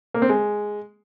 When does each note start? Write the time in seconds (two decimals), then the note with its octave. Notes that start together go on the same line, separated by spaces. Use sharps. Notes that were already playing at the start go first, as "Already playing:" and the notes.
0.14 A#3
0.22 C4
0.29 G#3